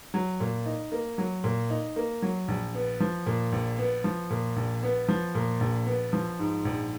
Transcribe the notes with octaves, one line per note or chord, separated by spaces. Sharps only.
F#3
A#2
D#4
A#3
F#3
A#2
D#4
A#3
F#3
A#1
B3
F3
A#2
A#1
B3
F3
A#2
A#1
B3
F3
A#2
A#1
B3
F3
G#2
A#1